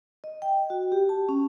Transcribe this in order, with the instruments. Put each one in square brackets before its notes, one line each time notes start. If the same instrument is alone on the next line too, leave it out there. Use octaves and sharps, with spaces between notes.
[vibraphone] D#5
G5
F#4
G4
A5
C#4